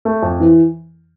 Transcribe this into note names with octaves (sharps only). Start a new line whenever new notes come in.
A3
F2
E3